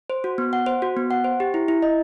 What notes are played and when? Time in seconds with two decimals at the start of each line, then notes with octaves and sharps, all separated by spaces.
0.10 C5
0.24 F#4
0.38 B3
0.53 F#5
0.66 C5
0.82 F#4
0.97 B3
1.11 F#5
1.24 C5
1.40 G4
1.54 E4
1.68 E4
1.82 D#5